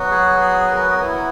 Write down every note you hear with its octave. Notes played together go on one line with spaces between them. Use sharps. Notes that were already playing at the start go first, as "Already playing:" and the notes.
Already playing: F#3 B3 F#4
G#4
G#4
A#4
B4
A#4
B3 E4